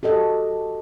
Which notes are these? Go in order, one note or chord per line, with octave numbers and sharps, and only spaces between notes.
F#4 G4 A4 D#5